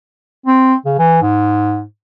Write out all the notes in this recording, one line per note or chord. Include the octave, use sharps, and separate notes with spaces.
C4
C#3
E3
G#2